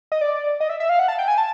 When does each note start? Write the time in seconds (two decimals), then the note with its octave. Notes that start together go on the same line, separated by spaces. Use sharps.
0.12 D#5
0.21 D5
0.60 D#5
0.70 E5
0.80 E5
0.89 F5
0.99 F#5
1.08 A5
1.19 G5
1.28 G#5
1.38 A5